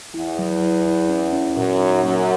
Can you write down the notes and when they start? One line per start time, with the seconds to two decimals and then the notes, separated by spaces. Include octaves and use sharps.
0.14 E2 E4
0.39 F#3
0.62 E4
0.85 E4
1.09 C#4
1.33 C#4
1.56 F#2 A#2
1.80 D#4
2.03 F#2 A#3